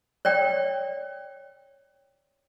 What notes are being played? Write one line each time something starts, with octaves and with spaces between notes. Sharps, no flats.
C#5 D5 G5